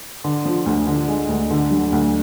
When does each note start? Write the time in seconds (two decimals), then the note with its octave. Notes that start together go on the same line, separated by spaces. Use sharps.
0.24 D3
0.45 F3
0.66 D2
0.87 D3
1.08 G#3
1.29 D2
1.50 D3
1.71 F#3
1.92 D2